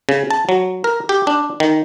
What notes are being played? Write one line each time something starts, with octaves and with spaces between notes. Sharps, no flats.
C#3
A5
F#3
A#4
G4
D4
D#3